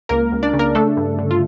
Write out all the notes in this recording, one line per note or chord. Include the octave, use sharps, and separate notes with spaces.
C#2 A#3 A#4
C#2
D4 D5
C#3
A#3 A#4
A3 D4 A4
G2
D3
F4